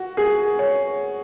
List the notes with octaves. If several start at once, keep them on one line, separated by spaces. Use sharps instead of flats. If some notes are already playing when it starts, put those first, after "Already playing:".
Already playing: F#4
G#4
C#5